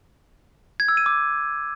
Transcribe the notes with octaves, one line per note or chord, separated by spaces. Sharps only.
G#6
E6
D#7
D6